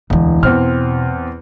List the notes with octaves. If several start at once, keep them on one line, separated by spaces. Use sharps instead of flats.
E1 D2 E3
E2 B2 C4 F6